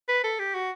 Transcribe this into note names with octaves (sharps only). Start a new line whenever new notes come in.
B4
A4
G4
F#4